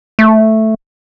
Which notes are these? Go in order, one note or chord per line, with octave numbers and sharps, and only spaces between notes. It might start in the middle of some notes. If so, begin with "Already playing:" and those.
A3